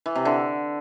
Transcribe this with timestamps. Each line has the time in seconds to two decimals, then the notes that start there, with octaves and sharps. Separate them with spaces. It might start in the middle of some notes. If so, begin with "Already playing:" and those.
0.06 E3
0.15 C3
0.25 D3